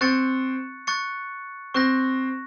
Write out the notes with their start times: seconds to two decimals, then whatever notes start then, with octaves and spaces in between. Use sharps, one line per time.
0.01 C4 C#6 F#6 A6 C#7
0.87 C#6 F#6 A6 C#7
1.74 C4 C#6 F#6 A#6